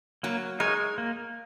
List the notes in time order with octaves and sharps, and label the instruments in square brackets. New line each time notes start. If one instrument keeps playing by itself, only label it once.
[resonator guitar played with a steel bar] F#3 [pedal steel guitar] A#3
[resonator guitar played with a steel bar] G#3 [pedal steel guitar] D#4 A#4 C#5
[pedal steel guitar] A#3